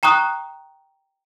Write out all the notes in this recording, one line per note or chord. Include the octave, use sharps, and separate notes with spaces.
G5 A#5 C#6 D#6 F#6